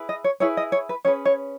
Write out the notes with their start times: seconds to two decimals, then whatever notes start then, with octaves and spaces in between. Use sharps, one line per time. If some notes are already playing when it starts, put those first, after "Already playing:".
Already playing: E4 G#4 B4
0.09 D#5
0.24 C#5
0.40 E4 G#4 B4 C#5
0.57 D#5
0.72 C#5
0.89 B4
1.05 C#4 G#4 B4 C#5
1.25 C#5